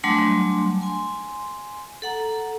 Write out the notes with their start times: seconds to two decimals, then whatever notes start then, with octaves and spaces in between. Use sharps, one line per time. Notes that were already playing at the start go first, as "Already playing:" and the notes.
0.04 F#3 G3 A3 D4 G#5 C6
0.81 G#5 C6
2.02 A4 F#5 A#5